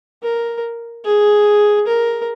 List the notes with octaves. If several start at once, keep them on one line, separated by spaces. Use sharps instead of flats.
A#4
G#4
A#4